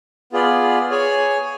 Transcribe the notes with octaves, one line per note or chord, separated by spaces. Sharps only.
B3 F4 G#4 D5
G#4 C#5 G#5